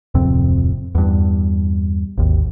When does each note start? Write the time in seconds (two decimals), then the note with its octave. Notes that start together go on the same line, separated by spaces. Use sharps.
0.15 D1 F2 C3 C4
0.95 E2 G2
2.18 G#1 D#2